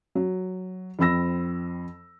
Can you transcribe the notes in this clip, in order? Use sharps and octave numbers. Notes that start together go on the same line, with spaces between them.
F#3
F2 C4 B5 E6 A#6